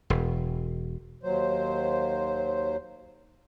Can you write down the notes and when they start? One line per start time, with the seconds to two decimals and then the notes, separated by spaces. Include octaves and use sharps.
0.10 E1
1.23 D#2 F#3 C5